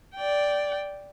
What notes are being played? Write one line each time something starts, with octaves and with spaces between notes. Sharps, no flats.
D5 G5